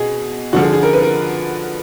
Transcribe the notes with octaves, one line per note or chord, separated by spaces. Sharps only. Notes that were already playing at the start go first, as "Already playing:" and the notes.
Already playing: B2 G#4
D3 F3 F#4
G#4
G#4
A#4
B4
A#4